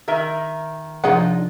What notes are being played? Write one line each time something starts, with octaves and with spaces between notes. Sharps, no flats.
D#3 A#4 E5
C3 F3 D4 D#4 F4 G#4 C#5 F#5